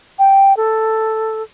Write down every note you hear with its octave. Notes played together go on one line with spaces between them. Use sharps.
G5
A4